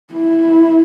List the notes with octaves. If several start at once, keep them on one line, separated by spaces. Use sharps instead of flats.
E4